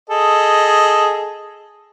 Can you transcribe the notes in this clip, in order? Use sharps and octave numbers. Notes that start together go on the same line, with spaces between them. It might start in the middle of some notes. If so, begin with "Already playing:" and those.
G#4 A4 D#5